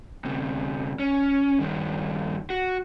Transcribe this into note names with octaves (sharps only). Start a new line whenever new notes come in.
D2 C3
C#4
G2 D#3
F#4